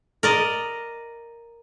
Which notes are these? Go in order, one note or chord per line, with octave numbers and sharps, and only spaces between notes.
A#4 D5 D#5